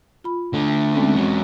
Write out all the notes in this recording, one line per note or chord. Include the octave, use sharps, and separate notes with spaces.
F4 B5
D3 A3
G#3 C4 C#4
E2 F#3